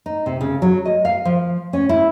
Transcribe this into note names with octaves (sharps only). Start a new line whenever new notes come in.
D#4
C3
C#3
F#3
D#5
F5
F3
C#4
E4